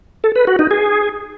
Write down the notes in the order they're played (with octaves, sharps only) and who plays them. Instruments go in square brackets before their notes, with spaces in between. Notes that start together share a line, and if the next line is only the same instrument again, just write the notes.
[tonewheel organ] A4
B4
F#4
D#4
G#4